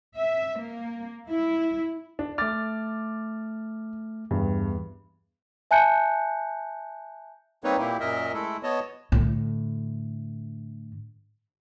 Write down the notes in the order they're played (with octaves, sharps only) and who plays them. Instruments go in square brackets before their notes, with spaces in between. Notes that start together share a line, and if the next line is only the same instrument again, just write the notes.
[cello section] E5
A#3
E4
[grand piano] D4
[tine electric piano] A3 F6 [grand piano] D6 A6
[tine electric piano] E2 [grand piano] G2
[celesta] E5 G#5 A5 F#6 G6 C#7
[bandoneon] G3 A#3 C4 D#4 B4 C#5
A#2 A#3 E4 G4
F#2 A#2 A#4 D#5 E5
G#3 A3 E4 A4
B3 C#5 D#5 A5
[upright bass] A2 D3